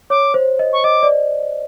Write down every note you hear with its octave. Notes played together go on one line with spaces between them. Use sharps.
C#5 D6
C5
D#5
C#6
D#5 D6
D5